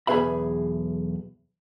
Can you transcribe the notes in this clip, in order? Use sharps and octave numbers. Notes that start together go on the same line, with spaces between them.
B1 E2 G#4 B4 E5 B5